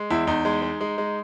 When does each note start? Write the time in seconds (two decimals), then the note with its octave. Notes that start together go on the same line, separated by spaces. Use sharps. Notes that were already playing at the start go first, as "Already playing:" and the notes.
Already playing: G#3
0.10 E2 E4
0.27 E2 D#4
0.45 G#3
0.62 G#3
0.81 G#3
0.98 G#3